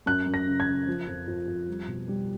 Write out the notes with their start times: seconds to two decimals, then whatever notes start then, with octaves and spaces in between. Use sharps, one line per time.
0.06 F#2 F#6
0.26 F#2
0.34 A#6
0.47 C#3
0.60 G#6
0.68 C#3
0.87 F3
1.08 F2
1.28 F2
1.48 F2
1.68 G3
1.88 B2
2.08 G3